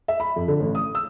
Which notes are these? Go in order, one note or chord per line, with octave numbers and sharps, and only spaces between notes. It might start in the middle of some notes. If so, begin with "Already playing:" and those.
E5
B5
F2
D3
A1
D#6
E6